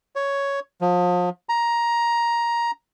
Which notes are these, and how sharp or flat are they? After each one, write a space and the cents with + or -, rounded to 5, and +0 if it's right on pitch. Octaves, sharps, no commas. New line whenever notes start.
C#5 +5
F3 +35
A#5 +10